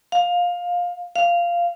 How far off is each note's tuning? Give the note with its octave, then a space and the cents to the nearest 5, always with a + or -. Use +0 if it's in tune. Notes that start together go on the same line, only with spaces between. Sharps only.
F5 +15
F5 -10